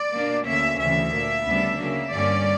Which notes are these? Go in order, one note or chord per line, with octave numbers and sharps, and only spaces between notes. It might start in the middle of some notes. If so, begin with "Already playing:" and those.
Already playing: D5
B2 A#3 D4
D2 D3 A#3 C#4 E5
D2 C#3 E3 E5
A#2 A#3 D4
D2 C#3 G3 B3 D4
C#3 F#3 A#3
G2 D3 G3 A#3 C#4 D5